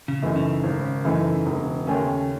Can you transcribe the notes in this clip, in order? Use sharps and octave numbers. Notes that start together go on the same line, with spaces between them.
C#3
F#2 E3 A3 D#4
C#3
G#1
F#2 E3 A3 D#4
E1
D#2 D#3 A3 C#4